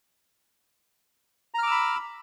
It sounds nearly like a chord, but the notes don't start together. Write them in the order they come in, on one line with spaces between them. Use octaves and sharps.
A#5 F6 D6 E6 B5